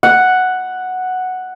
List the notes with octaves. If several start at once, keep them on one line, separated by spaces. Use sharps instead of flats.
F#5